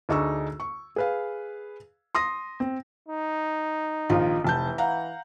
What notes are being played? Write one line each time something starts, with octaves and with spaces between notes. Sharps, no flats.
D2 D4 D#4 G#4 C#6 E6
C#6
G#4 B4 F5
C6 D#6 A#6
C4
D#4
A#1 D#3 F4
F1 E3 A5 G6
F5 F#5 A#5